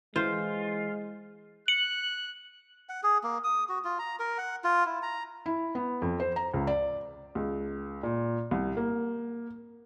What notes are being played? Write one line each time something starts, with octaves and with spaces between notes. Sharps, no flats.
E3 G#3 F4 C5
F#6 C#7 F#7
F#5
G#4
A#3
D#6
F#4
F4
A#5
A#4
F#5
F4
E4
A#5
E4
B3
F2
C5
A#5
C#2
D5
C#2
A#2
C2
A#3